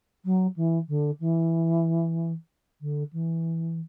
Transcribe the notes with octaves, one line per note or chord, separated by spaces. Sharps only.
F#3
E3
D3
E3
D3
E3